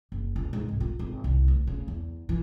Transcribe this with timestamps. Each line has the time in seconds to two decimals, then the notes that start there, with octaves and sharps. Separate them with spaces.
0.12 F#1
0.36 C#2
0.53 G#2
0.69 C2
0.80 F4
0.99 G#1
1.24 C2
1.48 D2
1.67 C#3
1.88 E2
2.29 E3